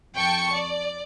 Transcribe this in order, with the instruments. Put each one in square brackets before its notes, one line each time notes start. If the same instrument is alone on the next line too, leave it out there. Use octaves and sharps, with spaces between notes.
[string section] F2 G5 A5 C#6 C#7
D5